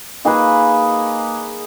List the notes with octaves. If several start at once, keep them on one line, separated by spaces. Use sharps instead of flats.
A#3 D#4 G#4 B4